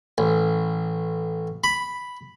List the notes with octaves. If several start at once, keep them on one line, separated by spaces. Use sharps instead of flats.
A1
B5